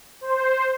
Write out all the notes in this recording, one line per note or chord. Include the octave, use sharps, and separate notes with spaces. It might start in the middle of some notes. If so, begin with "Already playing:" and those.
C5